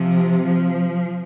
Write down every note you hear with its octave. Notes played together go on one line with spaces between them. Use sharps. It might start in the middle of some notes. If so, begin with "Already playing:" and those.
Already playing: C3 F3
F3